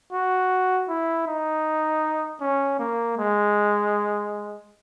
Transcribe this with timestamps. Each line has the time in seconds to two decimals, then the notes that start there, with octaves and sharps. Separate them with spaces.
0.13 F#4
0.89 E4
1.27 D#4
2.41 C#4
2.79 A#3
3.18 G#3